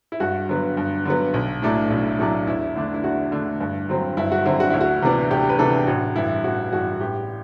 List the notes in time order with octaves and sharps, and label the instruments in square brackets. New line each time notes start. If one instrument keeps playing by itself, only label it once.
[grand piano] E4
G2 F#4
D3 F#3 B3
G2
D3 F#3 B3
B1
A2 F#3 A3 D4
B1
A2 F#3 A3 D4
E2 E4
D3 A3 D4
E4
E2 F#4
D3 A3 D4
G2
D3 F#3 C4
G2 E4
F#4
D3 F#3 C4 E4
F#4
D2 E4
F#4
C3 E3 B3 D4
D2 G4
B4
C3 E3 B3 D4 A4
A1 F#4
G2 E3 E4
A1 F#4
G2 E3 F#4
A1 G4